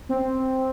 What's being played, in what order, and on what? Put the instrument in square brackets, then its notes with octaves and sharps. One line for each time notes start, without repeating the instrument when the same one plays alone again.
[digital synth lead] C4